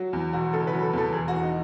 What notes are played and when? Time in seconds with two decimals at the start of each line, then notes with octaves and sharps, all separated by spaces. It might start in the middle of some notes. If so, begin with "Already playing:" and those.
Already playing: F#3
0.13 E2
0.33 E1 F#4
0.53 C#3 A4
0.67 B4
0.73 F#3
0.83 A4
0.93 E2 A4
1.12 E1 G#4
1.28 F#4
1.32 E2
1.43 D#4